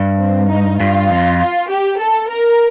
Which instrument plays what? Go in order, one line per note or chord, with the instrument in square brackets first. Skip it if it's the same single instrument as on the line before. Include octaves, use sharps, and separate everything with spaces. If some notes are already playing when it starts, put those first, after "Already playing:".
Already playing: [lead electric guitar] G2
[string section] C4
D#4
[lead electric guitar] G2 [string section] F4
[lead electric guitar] F2
[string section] F4
G4
A4
A#4